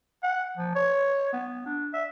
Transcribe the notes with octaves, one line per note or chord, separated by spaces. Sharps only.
F#5
F3
C#5
B3
D4
E5